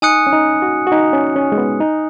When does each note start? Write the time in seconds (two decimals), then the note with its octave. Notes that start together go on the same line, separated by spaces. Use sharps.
0.02 D#4 G#5 D#6 F#6 C#7
0.27 C#4
0.33 D#4
0.62 F#4
0.87 F#4
0.92 D#4
1.13 C#4
1.36 C#4
1.52 G#3
1.58 B3
1.80 D#4